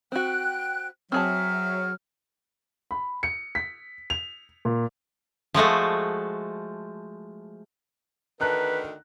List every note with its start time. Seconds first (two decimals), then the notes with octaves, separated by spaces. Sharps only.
0.12 C4 F#4 G5 F#6
1.12 F#3 C4 G#4 E5 A5 F6
2.91 B5
3.23 C#7
3.55 B6
4.10 F7
4.65 A#2
5.54 F3 G#3 A3 F#4
8.41 D2 D3 D#3 B4 A5 A#5 F#6